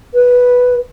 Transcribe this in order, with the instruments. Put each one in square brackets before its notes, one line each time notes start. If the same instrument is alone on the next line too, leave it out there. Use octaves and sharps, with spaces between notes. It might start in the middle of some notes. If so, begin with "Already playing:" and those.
[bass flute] B4